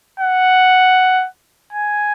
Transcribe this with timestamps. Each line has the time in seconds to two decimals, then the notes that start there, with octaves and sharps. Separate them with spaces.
0.20 F#5
1.73 G#5